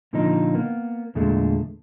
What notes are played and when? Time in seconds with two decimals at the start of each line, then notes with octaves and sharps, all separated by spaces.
0.13 A#2 D3 F3 C4 D#4
0.55 A#3 B3
1.15 E2 A#2 D3 G#3 A3